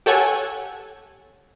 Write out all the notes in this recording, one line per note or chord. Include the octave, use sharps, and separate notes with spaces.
G4 A4 C#5 F#5 G#5